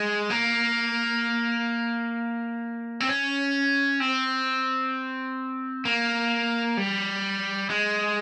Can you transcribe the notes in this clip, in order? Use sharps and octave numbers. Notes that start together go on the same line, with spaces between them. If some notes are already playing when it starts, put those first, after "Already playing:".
Already playing: G#3
A#3
C4
C#4
C4
A#3
G3
G#3